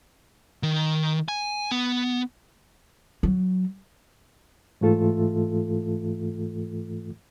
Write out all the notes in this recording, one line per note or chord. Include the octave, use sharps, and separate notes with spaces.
D#3
G#5
B3
F#3
G#2 E3 A3 F4 A4